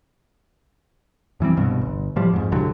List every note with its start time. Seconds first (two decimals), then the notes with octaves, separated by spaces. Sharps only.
1.40 F#2 E3 G3 C4
1.57 C2 G2 B2
1.82 G1
2.16 A2 F3 G3
2.34 F2 G#2
2.52 C2 G2 D3 F#3